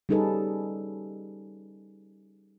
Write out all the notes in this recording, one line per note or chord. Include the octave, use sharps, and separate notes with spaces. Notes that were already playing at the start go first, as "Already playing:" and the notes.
G3 C#4 D#4 G#4 A4 B4